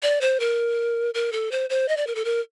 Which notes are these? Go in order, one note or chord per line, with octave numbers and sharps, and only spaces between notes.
D5
C5
A#4
A#4
A4
C5
C5
D#5
D5
A#4
A4
A#4